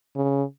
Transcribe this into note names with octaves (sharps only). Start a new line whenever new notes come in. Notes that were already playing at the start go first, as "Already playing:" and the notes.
C#3